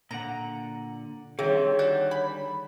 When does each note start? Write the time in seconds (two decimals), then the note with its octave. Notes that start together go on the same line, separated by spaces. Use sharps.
0.11 A#2 D3 F#5 A#5
1.39 D3 D#3 G3 C4 G#4 C#5 E5
1.79 F#4 D5 G6
2.11 B5